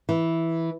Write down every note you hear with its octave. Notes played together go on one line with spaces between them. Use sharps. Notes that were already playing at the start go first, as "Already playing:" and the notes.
E3